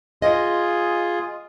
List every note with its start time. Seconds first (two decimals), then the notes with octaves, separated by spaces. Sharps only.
0.22 F4 G#4 D#5